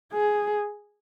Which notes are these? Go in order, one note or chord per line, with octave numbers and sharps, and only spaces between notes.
G#4